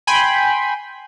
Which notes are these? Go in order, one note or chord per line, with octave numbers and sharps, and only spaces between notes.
G5 G#5 B5 C6